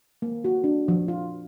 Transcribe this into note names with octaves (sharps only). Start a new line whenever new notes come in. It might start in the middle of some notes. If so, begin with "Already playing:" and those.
A#3
F#4
D4
F3
F4